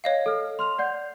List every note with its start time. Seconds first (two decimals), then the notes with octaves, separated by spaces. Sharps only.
0.04 C#5 D#5 F5
0.26 A4 F6
0.59 C6 F6 F7
0.78 D5 F#5 G6